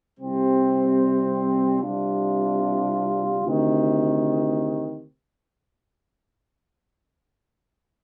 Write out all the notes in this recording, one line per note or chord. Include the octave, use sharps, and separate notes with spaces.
C2 C3 G3 C4
C2 C3 G3 D4 F4
D2 C3 D#3